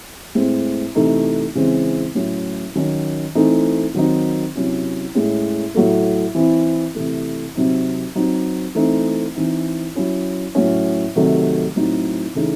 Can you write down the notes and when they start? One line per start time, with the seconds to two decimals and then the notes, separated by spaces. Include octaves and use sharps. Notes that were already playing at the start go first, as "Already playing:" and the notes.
0.35 A2 G#3 C4
0.95 C3 E3 A3 D#4
1.55 C#3 E3 G#3 C4
2.15 A2 F#3 C#4 E4
2.75 D#3 F#3 C#4
3.35 E3 A3 C4 D#4
3.94 D#3 F#3 C4 D#4
4.55 C3 F#3 C#4 E4
5.15 A2 G#3 C#4
5.74 A2 F#3 A3
6.35 E3 C4 E4
6.95 C3 E3 A3
7.55 C3 F#3 C4 D#4
8.15 F#3 C4 D#4
8.75 E3 A3 C4 D#4
9.36 E3 C4 D#4
9.95 F#3 C#4 E4
10.55 A2 F#3 C#4
11.16 C3 D#3 F#3 A3
11.76 A2 F#3 C4 D#4
12.35 C#3 E3 A3 D#4